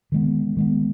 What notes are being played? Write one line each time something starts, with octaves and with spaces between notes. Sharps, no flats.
D#3 G#3 B3
D#3 G#3 B3